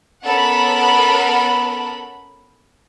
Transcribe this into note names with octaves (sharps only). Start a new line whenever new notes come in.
B3 C#4 A4 A#4 F#5 B5